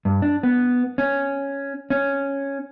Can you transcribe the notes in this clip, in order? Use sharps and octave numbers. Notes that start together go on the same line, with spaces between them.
G2
D4
B3
C#4
C#4